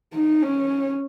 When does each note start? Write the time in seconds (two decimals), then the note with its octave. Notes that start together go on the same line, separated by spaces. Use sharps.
0.14 D#4
0.42 C#4